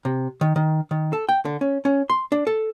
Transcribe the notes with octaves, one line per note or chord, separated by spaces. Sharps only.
C3
D#3
D#3
D#3
A4
G5
D3
C#4
C#4
C6
D4
A4